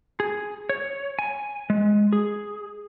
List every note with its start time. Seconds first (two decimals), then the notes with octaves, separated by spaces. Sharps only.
0.20 G#4
0.69 C#5
1.19 G#5
1.70 G#3
2.13 G#4